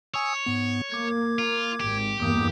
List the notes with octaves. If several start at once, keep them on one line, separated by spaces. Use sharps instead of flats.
C#5 G#5 D#6 E6
G#2 B3
A#3 D6 G#6
F4
G#1 G4
E2 G2 A#3 D6 D#6 G6